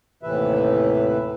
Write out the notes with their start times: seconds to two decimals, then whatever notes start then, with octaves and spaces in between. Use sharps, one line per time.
0.23 D#2 A2 C3 E3 B4 E5